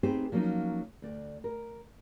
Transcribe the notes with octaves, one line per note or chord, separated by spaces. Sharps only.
B3 C4 D#4 G4 G#4 C5
F3 F#3 A#3 C4 C#4 D#4
D2 D5
A#4